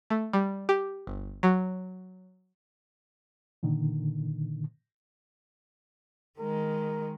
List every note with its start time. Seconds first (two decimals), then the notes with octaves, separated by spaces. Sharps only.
0.10 A3
0.33 G3
0.69 G4
1.07 G1
1.43 F#3
3.63 A#2 D3 D#3
6.39 D#3 G#3 A#4